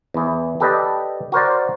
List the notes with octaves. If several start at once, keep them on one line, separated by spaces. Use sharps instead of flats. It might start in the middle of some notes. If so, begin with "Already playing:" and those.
E2 E3
G4 A4 B4 D5 D#5
F#4 A#4 C5 D5